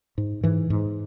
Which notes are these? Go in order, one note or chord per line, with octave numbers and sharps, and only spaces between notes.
G#2
G#2 E3
G#2